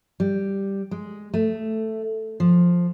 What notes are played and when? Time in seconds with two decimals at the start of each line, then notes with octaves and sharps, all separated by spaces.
0.20 G3
0.91 G#3
1.34 A3
2.40 F3